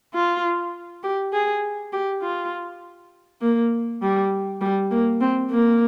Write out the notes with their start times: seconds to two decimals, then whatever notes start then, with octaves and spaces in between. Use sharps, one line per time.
0.14 F4
1.03 G4
1.33 G#4
1.93 G4
2.22 F4
3.41 A#3
4.02 G3
4.61 G3
4.91 A#3
5.21 C4
5.51 A#3